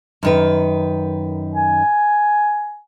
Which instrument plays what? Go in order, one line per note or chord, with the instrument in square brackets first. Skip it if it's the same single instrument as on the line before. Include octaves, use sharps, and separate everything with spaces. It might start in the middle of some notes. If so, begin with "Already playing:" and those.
[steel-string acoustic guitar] F#2 D#3 B4
[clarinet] G#5